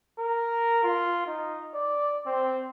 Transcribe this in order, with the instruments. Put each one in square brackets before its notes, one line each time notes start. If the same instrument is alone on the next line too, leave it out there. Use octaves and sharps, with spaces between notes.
[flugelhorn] A#4
F4
D#4
D5
C4